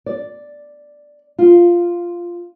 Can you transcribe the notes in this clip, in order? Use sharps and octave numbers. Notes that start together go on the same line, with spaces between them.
D5
F4